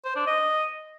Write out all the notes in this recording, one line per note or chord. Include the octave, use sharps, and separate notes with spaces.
C5
D4
D#5